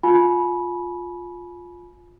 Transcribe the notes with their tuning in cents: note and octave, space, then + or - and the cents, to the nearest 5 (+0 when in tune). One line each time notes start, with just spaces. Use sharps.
F4 +10 G#5 +30 B5 -15